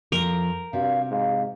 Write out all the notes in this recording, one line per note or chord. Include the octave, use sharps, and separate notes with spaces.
F2 F3 A#4
G2 C3 F#4 F5
G#2 F5